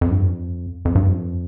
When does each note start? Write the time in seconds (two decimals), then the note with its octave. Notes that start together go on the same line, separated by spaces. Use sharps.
0.01 F2
0.11 G2
0.22 F2
0.85 F2
0.95 G2
1.07 F2